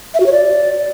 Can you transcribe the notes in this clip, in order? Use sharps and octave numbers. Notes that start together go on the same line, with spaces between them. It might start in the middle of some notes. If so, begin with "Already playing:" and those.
E5
F#4
C#5
D5